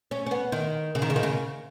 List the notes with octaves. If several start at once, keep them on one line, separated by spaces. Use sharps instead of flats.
C#4
C#4
B3
D#3
C#3
D#3
C#3
D#3
C#3